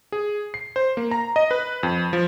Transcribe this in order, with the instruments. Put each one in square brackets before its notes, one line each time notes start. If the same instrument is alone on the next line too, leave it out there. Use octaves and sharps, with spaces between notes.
[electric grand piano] G#4
C7
C5
A#3
A#5
D#5
B4
F2
F3